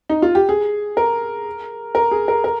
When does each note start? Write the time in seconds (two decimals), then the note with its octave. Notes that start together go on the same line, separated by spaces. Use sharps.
0.09 D#4
0.22 F4
0.35 G4
0.49 G#4
0.97 A#4
1.95 A#4
2.11 G#4
2.28 A#4
2.44 A#4